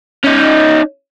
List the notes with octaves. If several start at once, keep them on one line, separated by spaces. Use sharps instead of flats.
C#4 D#4